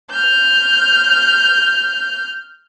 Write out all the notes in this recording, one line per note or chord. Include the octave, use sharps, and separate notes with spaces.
F6 G6